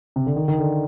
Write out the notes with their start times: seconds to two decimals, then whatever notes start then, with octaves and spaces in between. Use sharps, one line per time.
0.16 C3
0.26 D3
0.36 D#3
0.48 D#3
0.59 D3